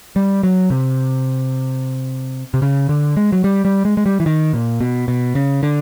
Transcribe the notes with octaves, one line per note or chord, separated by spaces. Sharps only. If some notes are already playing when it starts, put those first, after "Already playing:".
G3
F#3
C3
C3
C#3
D3
G#3
F#3
G3
G3
G#3
G#3
G3
E3
D#3
A#2
B2
B2
C#3
D3